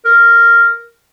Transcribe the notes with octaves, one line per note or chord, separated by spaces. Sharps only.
A#4